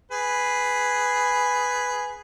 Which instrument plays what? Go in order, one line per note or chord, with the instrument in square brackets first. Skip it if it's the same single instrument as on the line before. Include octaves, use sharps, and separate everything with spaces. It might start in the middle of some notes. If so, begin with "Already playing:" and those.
[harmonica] G#4 B4